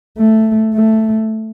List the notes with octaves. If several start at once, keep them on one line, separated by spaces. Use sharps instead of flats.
A3
A3